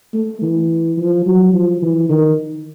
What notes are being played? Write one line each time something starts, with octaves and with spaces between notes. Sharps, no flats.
A3
E3
F3
F#3
F3
E3
D#3